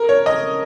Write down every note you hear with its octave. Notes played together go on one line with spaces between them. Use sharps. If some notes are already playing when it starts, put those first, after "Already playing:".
Already playing: A#4
C#5
D#5